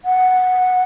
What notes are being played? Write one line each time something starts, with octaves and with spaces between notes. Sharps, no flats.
F#5